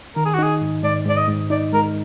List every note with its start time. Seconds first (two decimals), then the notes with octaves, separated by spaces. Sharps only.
0.16 D#3 A#4
0.26 G#4
0.34 F#4
0.39 D#4 G#4
0.61 G#2
0.83 G#2 D5
1.06 G#2 D5
1.17 D#5
1.28 G#2
1.50 D#4 D5
1.73 G#3 A#4